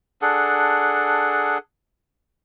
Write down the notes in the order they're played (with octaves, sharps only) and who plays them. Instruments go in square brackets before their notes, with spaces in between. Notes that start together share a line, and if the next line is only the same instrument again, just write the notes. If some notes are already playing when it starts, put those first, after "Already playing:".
[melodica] D4 G#4 A4 F#5